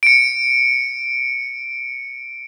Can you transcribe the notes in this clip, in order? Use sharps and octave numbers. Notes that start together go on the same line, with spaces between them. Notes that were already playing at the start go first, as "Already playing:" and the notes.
C#7 D7